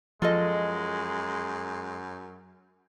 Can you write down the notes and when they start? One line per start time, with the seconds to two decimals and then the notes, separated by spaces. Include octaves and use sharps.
0.22 F#2 F3 G#3 F4 A4 D#5